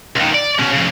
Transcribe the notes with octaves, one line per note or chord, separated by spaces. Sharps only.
C#2 D#3
D5
B2 C#4
F2 C#3